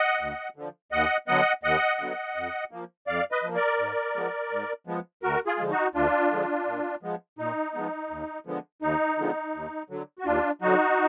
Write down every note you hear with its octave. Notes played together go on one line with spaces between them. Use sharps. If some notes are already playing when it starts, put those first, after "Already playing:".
Already playing: D#5 F#5
D2
D3 F3
D#2 D#5 F#5
D3 F#3 B3 D#5 F#5
D#2 D#5 F#5
D3 F#3 B3
F2
F3 A#3
F2 D5 F5
B4 D#5
F3 A#3
A#4 D5
G#2
F3 G#3 B3
G#2
F3 G#3 B3
D2 F#4 A#4
F4 G#4
D3 F3 G#3
D#4 F#4
D2 D4 F4
D3 F3 G#3
A#2
F3 G#3 B3
A#2 D#4
F3 G#3 B3
D#2
D3 F3 G#3 B3
D#2 D#4
D3 F3 G#3 B3
D#2
D3 F#3
F#4
D#2 D4 F4
D3 F#3 D#4 F#4